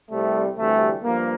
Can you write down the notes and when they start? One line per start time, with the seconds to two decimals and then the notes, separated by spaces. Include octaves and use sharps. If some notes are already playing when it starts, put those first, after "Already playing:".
0.10 C2 C3 G3 A3
0.57 D2 C3 E3 G3 A3
1.03 G2 F3 A#3